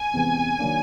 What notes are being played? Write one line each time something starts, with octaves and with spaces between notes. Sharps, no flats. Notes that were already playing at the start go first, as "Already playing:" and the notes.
Already playing: G#5
E2 C3 E3 G#3 B3
D#3 F#3 A#3 D4